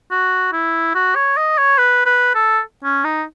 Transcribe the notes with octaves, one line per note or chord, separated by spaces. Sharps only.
F#4
E4
F#4
C#5
D#5
C#5
B4
B4
A4
C#4
D#4